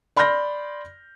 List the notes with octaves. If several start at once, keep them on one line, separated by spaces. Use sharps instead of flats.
D5 B5 C6 F6 G6 A#6